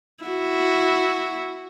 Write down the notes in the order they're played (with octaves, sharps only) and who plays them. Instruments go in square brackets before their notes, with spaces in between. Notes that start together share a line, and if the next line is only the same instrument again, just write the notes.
[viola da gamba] E4 F#4